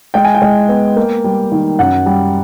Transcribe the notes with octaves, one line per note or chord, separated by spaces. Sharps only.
G#3 G5
G#5
G5
G#3
B3
A#3
G3
D#3
F#2 F#5
G3